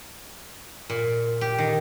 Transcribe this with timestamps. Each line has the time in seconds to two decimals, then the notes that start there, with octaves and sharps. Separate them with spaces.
0.90 A#2
1.41 G4
1.58 D#3